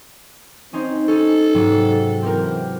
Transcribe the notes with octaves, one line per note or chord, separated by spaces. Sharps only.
C4 C#4 D#4 C5
C#4 D#4 A4
G#2 C3 F#3
E3 C4 G4 A#4